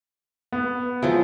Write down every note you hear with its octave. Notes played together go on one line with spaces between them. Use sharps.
B3
F3 F#3 G#3 E4